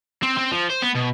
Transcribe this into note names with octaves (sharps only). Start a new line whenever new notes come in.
C4
C4
F3
C5
B3
B2